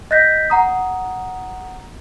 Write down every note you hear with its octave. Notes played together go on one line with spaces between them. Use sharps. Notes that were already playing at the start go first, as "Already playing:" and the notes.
D#5 F#6 G6 A#6 B6
F#5 A#5 D#6